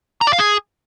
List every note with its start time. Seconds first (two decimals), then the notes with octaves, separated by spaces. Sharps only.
0.21 A#5
0.27 D5
0.33 F5
0.39 G#4